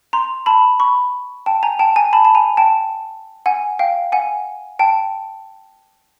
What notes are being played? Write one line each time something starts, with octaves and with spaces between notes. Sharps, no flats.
A#5 C6
A5 B5
B5 C#6
G5 A5
G#5 A#5
G5 A5
G#5 A#5
A5 B5
A5
G#5 A#5
G5 A5
F#5 G#5
F5 G5
F#5 G#5
G5 A5